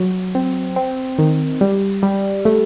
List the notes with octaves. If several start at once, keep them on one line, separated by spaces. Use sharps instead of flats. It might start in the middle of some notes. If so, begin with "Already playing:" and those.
Already playing: F#3
C4
C4
D#3
G3
G3
A3